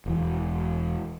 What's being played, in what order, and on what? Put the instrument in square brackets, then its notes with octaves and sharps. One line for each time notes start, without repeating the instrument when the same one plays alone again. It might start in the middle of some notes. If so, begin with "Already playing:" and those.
[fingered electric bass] E1 E3